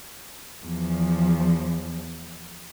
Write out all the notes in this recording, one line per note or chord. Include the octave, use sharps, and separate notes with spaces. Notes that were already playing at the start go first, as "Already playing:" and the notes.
E2 F3